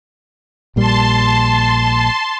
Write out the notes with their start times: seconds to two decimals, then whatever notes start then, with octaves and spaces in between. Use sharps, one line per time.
0.76 A#1 A#2 G3 A5 C6